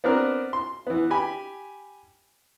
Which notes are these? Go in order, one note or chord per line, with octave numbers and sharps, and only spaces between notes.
B3 C4 D4 A#4
C6
E3 B3
G4 G#5 B5